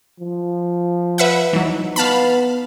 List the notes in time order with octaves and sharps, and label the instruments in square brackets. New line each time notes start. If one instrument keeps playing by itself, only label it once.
[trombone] F3
[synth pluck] B4 E5 F#5
[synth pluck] E3 F#3 [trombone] D#4
[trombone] B3 [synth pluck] F5 A5 B5